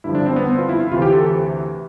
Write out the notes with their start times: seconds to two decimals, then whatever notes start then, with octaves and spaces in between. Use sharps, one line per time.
0.04 G2 D3 F3 E4
0.15 D4
0.26 C4
0.36 B3
0.48 C4
0.58 F4
0.69 E4
0.80 F4
0.91 D2 C3 E3 F4
1.02 G4
1.13 A4